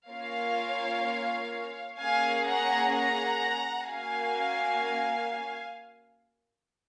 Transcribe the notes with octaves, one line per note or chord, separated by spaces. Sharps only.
A#3 C#4 F4 C#5 F5
A#3 C#4 G#4 F5 G#5
F#5 A#5
F#5 A#5
A#3 C#4 F#4 F5 G#5